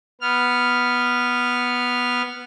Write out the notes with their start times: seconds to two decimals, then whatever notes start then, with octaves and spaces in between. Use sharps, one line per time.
0.21 B3 F6